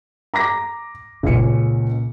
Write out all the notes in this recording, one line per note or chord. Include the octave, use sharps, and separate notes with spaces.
A#5 D6 A#6
C#2 A#2 C#3 C#4 C#7